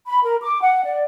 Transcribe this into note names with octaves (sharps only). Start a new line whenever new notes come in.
B5
A#4
D6
F#5
D5